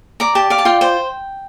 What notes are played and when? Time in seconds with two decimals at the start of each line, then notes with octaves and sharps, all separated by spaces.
0.20 D5 A#5
0.35 G4 A5
0.50 D5 F5
0.58 A5
0.65 F4 G5
0.81 C5 G5